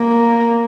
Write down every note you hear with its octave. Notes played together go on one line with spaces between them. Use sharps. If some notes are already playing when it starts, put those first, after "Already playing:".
Already playing: A#3